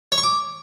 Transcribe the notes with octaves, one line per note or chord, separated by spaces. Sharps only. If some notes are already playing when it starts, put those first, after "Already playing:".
C#5
C#6
D6